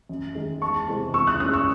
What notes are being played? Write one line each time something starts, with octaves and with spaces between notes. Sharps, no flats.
F#2
D#3 G#3 D#4
E2 A5 C#6
C3 E3 G#3 C4
C#2 C#6 E6
D#6 F#6
C#3 G#3 C#4 E4 D#6 F#6
C#6 E6